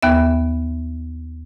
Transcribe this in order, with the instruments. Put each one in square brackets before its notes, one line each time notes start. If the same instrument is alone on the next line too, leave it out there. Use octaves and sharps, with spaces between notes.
[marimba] D#2 B3 E5